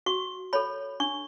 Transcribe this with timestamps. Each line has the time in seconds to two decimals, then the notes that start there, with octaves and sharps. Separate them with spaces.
0.06 F#4 C#6
0.53 A4 C#5 B5
1.00 D4 C#6